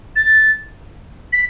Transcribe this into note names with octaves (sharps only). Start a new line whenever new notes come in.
A6
B6